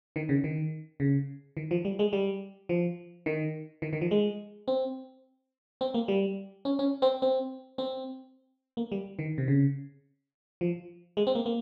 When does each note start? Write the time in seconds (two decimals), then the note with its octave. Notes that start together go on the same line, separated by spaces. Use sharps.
0.16 D#3
0.29 C#3
0.44 D#3
1.00 C#3
1.57 D#3
1.71 F3
1.85 G3
1.99 G#3
2.13 G3
2.69 F3
3.26 D#3
3.82 D#3
3.93 D#3
4.01 F3
4.11 G#3
4.68 C4
5.81 C4
5.94 A#3
6.08 G3
6.65 C#4
6.79 C#4
7.02 C4
7.22 C4
7.78 C4
8.77 A#3
8.92 G3
9.19 D#3
9.38 C3
9.48 C#3
10.61 F3
11.17 G#3
11.27 C4
11.35 A#3
11.46 A#3